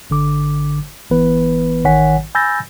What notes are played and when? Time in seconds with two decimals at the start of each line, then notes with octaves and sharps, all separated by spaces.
0.10 G1 D3 D6
1.11 G1 E3 B3 B4
1.85 A1 D#3 C#5 F#5 G#5 B6
2.35 G#5 B5 E6 G6 A6 A#6